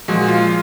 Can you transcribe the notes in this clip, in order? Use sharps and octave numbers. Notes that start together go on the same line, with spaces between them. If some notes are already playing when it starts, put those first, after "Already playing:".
A#2 F3 G#3 F#4
F4